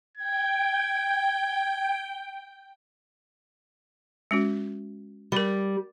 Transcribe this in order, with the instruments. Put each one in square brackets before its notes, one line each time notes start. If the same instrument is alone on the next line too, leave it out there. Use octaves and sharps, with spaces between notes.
[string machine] G5 [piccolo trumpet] G#6
[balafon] G#3 C#4 F#4
[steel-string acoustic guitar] G3 [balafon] A#4 B5